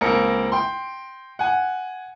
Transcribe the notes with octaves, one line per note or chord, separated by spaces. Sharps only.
C#2 A#3 C4 A#4 C#7
G5 C6
F#5 G#5